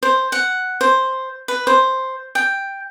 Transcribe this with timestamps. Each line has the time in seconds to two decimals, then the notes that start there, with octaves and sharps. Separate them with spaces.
0.03 C5
0.32 F#5
0.81 C5
1.48 B4
1.67 C5
2.35 G5